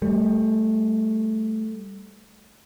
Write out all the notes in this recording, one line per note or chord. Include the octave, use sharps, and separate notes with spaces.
G3 A3